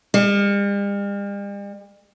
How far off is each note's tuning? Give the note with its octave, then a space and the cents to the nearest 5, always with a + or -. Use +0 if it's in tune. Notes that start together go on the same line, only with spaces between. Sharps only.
G3 +45